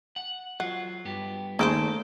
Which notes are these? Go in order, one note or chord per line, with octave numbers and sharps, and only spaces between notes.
F#5
F#3 F4 F#5
G2 B3 G4
D#2 C#3 A3 E4 A4 C5 D7